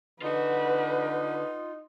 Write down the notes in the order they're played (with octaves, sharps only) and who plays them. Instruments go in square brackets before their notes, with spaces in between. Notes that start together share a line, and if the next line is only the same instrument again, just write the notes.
[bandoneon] D3 [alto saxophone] D#4 [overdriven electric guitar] F4 F#5 [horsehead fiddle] B4